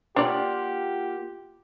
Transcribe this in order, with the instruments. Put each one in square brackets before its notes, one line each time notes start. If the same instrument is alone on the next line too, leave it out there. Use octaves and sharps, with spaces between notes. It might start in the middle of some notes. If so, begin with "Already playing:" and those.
[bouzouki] A#3 F4 F#5 [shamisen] D4 D5 [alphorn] G4